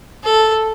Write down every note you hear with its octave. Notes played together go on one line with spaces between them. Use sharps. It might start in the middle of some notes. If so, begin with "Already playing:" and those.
A4